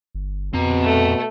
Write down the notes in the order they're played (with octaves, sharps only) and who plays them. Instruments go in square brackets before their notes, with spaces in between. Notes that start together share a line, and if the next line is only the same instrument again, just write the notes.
[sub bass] G1
[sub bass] F2 [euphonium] B2 [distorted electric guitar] C4 A#5
[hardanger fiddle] A3